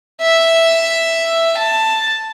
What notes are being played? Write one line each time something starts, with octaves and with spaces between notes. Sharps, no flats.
E5
A5